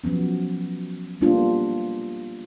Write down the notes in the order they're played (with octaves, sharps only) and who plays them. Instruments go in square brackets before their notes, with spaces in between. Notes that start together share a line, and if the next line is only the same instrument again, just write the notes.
[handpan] F3 F#3 B3 C#4
G3 A#3 B3 D4 F4